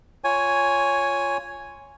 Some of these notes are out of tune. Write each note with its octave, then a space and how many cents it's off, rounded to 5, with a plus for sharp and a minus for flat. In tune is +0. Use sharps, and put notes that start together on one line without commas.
F4 +0 C#5 +10 G#5 +0